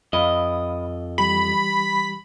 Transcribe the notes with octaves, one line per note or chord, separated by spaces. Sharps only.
F2 D#5 F5 B5 E6
E3 G3 G4 B5